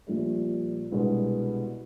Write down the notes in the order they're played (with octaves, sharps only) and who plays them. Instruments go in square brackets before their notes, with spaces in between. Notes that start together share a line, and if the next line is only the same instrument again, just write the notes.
[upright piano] A#1 A#2 G3
C2 B2 G#3 B3 D4